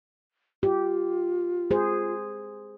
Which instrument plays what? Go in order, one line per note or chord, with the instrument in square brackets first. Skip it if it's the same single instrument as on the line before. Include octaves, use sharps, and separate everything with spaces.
[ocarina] F4 [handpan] G4
[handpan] G#4 C5